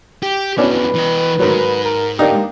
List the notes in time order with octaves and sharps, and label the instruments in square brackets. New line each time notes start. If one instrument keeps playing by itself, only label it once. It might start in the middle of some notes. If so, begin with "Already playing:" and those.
[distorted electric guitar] G4
[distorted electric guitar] F2 E3 [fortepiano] B2 C#4 D4 [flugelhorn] B4
[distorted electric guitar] E3 D#5
[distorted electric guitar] G#2 [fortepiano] D#3 F#3
[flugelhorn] A#4
[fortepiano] A#3 D4 D#4 [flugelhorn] G4